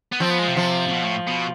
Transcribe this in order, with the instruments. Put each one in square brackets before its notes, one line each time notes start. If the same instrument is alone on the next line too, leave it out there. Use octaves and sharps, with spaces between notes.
[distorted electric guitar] B3
[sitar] F3 [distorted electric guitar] C4
[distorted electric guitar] B3
G#3
C3
[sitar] F3
[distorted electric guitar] C3
B2
A2
B2